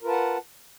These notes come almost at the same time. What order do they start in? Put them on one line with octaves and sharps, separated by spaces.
A#4 F4 B4 A5 F#5